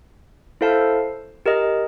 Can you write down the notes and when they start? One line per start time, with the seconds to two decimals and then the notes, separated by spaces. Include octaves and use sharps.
0.61 E4 A4 C5 F5 A5
1.46 G4 A#4 D#5